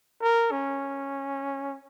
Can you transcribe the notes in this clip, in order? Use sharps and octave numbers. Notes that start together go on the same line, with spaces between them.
A#4
C#4